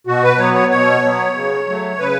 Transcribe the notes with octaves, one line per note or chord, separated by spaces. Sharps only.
B2 F#4
B4
F#3 B3 C#5
C#5
B2 C#5
F#3 B3
C#3
F#3 A3
C#3 B4